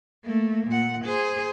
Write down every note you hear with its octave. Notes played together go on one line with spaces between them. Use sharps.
A3 A#3
A#2 F#5
G#4 C5